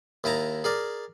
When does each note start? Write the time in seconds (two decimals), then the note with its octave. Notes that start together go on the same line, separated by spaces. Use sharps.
0.24 D#2 E4 D#5 A5 A#5
0.64 G#4 A#4 D5